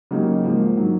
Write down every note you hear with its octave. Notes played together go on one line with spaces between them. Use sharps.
C#3 F#3 A#3 D#4 G4
G#2 F3 A#3
D#3 F#3